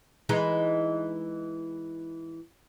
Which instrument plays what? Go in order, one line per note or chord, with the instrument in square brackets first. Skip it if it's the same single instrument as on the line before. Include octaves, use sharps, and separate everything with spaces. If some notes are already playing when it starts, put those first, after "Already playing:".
[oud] E3 G#3 D#4